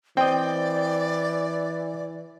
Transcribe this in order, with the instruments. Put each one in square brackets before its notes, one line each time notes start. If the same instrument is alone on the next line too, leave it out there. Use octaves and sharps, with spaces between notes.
[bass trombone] E3 [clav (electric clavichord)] C4 D#5 [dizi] D5 [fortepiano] G5